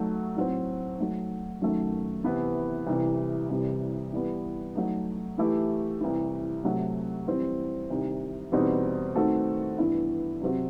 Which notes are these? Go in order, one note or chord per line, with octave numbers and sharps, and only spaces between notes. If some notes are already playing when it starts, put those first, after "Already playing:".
Already playing: F#3 A3 D#4 F#4
A2 F#3 C4
F#3 A3 D#4
F#2 D#3 F#3 A3
C3 E3 B3 E4 B4
C2 C3 E3
C2 C3 E3 G3
E3 G3 B3
F#3 A3 D#4
E3 A3 E4 G4
C2 C3 E3
C3 F#3 A3
E3 G3 C4
C2 C3 D#3
E2 B2 G3 C4 D#4
D#3 A3 C4 F#4 A4
G2 E3 B3 E4
C3 F#3 C4 F#4